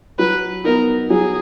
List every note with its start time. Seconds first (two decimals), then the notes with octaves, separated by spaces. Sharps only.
0.19 F#3 B4
0.64 B3 D#4 A#4
1.10 F#3 G#4